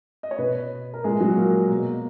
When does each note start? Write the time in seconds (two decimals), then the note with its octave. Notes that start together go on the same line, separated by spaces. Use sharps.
0.23 D#5
0.31 C#5
0.38 B2 B3 B4
0.94 A#4
1.04 A#2 G#3 G#4
1.20 F#3 F#4
1.37 A#3 A#4
1.71 B2